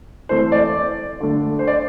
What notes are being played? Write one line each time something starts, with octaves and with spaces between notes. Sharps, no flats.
E3 A3 C4 C5
D5
D3 A3 D4
C5
D5